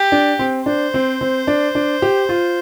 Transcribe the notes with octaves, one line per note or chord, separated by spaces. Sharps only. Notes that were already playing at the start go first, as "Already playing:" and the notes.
Already playing: G4
D4
C4
D4 C5
C4
C4
D4
D4
G4
F4